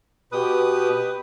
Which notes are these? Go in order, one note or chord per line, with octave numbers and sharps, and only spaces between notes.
B2 G4 B4 D#6